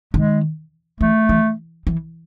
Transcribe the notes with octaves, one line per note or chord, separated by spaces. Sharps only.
D#3 G#3
E3 A3
E3
E3